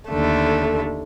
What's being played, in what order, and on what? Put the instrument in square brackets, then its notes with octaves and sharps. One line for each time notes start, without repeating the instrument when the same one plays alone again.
[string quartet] D#2 D3 A3